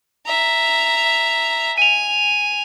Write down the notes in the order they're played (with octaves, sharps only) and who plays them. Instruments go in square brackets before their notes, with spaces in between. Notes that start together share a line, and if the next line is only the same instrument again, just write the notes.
[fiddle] E5 A#5
[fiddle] G#5 [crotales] D#7 F7